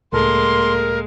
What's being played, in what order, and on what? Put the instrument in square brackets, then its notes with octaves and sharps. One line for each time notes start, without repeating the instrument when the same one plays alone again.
[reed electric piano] C#2 A2 A4 [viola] G#3 A#3 [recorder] A#4 [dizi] C6